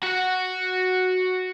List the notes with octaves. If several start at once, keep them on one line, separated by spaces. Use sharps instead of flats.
F#4 F#5